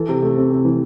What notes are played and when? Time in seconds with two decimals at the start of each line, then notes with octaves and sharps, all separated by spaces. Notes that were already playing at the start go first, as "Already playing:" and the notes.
Already playing: E3 A4
0.09 C3
0.23 A3
0.37 C4
0.52 C3
0.65 E3